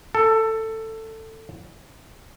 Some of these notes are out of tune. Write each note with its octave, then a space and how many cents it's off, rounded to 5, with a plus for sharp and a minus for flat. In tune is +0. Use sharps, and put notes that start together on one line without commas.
A4 +15